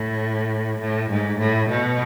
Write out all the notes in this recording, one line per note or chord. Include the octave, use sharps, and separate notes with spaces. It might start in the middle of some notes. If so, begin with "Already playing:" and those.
Already playing: A2
A2
G#2
A2
B2